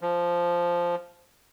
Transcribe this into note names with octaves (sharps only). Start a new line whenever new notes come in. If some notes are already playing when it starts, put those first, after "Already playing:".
F3